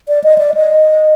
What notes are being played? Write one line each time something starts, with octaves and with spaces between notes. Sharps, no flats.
D5
D#5
D5
D#5